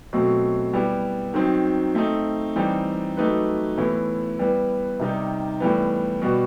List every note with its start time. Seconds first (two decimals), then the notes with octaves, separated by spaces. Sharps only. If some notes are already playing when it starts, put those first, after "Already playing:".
0.13 B2 F#3 A3 C4
0.73 G3 B3 E4 G4
1.34 D#3 F#3 C4 D#4
1.95 A3 C4 D#4
2.56 E3 G3 C4 D#4
3.17 F#3 A3 D#4 G4 B4
3.77 A2 E3 B3 E4
4.39 G3 B3 E4 B4
5.00 C3 D#3 G3 D#4
5.60 A2 E3 G3 B3
6.22 B2 G3 B3 F#4